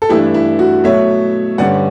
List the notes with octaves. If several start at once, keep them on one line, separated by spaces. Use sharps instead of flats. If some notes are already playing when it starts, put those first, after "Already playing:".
A4
G2 E3 A3 D4 E4 G4
E4
F#4
B2 F#3 A3 C#5 E5
G2 D3 G3 C#4 D5 F#5